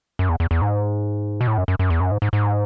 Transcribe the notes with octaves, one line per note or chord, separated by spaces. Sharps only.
F#2
E2
E2
E2
G#2
B2
A2
F#2
F#2
F#2
E2
F#2
G#2
G#2
G#2